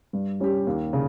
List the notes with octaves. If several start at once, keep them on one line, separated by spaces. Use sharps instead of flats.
G2
G3 C#4 G4
D#2
C#3